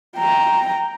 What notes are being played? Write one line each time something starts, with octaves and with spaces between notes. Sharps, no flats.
G5 A#5